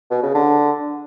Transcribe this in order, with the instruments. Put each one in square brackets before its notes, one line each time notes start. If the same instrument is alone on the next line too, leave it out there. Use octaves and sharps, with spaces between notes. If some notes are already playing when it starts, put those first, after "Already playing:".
[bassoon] B2
C#3
D3